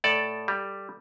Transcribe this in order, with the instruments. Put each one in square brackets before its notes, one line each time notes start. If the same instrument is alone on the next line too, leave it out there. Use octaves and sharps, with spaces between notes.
[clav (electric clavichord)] A2 A4 D5
G3